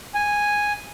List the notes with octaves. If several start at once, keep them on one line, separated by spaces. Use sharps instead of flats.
G#5